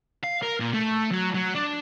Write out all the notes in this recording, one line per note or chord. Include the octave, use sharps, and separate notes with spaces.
F5
A#4
A#2
A3
F#3
F#3
D4